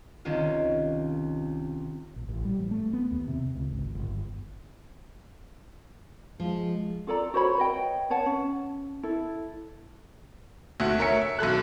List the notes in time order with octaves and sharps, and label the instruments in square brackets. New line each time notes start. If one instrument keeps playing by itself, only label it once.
[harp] C2 D#3 C#4 F4
[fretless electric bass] A#1
A1
G3
A1
A3
B3
D#2
C3
C#2
G#1
G1
G1
[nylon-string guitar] F3 [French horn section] G#3
[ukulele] F4 A4 D5 A#5
F#4 C5 C#5 B5
B4 C#5 D#5 G5
B4 C#5 F#5 A5
C#4
E4 A4
[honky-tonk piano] D2 A3 F#4
A3 A#4 C#5 E5 G#5 C#7
E5
B1 F#2 A4 F#6